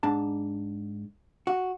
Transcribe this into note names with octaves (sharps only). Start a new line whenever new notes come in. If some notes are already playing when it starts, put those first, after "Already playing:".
G#2 D4 A5
F#4